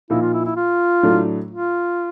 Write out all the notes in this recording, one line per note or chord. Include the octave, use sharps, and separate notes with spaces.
A#2 F3 A#3 D#4 E4
F4
E4
E4
F4
A2 F#3 A3 D4
F4